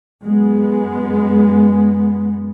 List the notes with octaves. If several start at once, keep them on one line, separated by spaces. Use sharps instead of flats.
F#2 G#3 B3